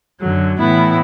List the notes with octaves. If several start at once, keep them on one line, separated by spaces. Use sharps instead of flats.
F#2 D3 F#3
A2 E3 B3 E4